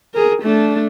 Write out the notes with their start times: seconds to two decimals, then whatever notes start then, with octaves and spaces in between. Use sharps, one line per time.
0.14 G#4 A#4
0.42 A3 D4